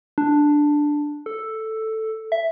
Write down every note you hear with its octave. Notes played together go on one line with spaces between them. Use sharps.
D4
A4
E5